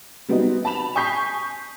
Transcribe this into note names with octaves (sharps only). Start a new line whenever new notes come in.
F#3 G3 B3 C4 D#4
A5 B5 E7 F7
G#5 C#6 D#6 G6 B6 C7